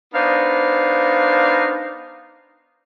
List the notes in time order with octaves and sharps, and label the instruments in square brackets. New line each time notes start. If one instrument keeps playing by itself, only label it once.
[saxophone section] B3 D4 D#4 C5 F5